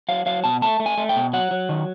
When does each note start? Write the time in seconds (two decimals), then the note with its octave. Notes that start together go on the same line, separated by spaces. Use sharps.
0.09 F#3 F5
0.26 F#3 F5
0.44 B2 A5
0.62 A3 A5
0.80 A3
0.86 G#5
0.98 A3
1.09 G5
1.16 B2
1.33 F#3 F#5
1.51 F#3
1.69 D#3